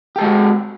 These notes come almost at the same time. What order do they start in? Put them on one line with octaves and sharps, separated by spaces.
G4 A4 G#3 F#4